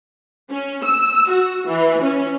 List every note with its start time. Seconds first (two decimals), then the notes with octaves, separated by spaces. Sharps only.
0.51 C#4
0.84 E6
1.30 F#4
1.67 E3
2.02 C#4